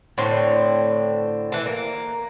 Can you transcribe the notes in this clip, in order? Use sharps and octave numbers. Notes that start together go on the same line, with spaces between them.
A2 D3 C4
E3 A5
A#3